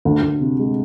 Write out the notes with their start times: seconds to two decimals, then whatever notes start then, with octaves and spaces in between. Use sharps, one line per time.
0.05 D2
0.22 D2
0.41 C3
0.59 G#3